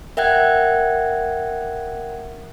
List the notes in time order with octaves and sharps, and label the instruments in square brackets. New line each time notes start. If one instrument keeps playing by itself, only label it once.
[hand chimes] A#4 E5 F#5 G5 F#6 G#6